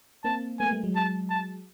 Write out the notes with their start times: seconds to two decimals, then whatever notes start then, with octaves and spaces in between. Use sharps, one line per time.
0.24 A#3 C4 A5
0.60 A3 B3 G#5
0.66 A#3
0.71 G3 A3
0.84 F#3 G#3
0.96 A5
1.30 A5